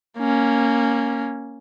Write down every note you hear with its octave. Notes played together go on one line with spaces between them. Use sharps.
A#3 C#4